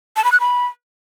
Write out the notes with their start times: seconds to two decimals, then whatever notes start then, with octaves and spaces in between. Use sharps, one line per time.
0.16 A5
0.24 B5
0.32 F#6
0.40 B5